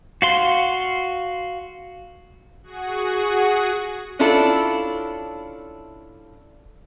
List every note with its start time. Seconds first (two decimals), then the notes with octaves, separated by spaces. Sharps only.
0.22 F#4 F5 C6
2.63 F#4 G#4 F#5 C#6 D#6
4.19 C#4 D4 E4 F4 A4